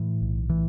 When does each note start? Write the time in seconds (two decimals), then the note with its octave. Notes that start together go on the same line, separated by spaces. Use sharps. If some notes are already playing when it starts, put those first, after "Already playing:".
Already playing: A2 E3
0.22 B1
0.50 A2 E3